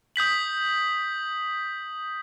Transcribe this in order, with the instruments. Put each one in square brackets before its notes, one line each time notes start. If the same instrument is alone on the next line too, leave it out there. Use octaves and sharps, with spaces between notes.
[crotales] D#6 G6 B6 F#7